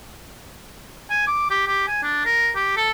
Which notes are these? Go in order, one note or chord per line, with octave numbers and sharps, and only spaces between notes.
G#5
D6
G4
G4
G#5
D4
A#4
G4
A4